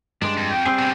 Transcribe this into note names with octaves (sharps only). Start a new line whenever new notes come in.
G2 G#3 D4
F2
G5
G3 C4 G#4
B2 D3